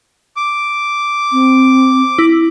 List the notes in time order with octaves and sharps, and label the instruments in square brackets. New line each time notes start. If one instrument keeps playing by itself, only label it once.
[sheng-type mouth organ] D6
[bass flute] C4
[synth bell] E4